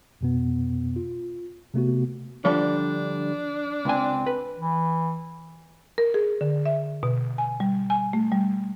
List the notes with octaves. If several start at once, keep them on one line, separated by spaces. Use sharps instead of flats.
F2 B2 B3
F4
C3 A3 B3 F#4
D3 F3 G3 D4
C#2 C4 G#5
B4
E3
A#4
G#4
D3
E5
B2
G#5
G3
G#5
A3
G3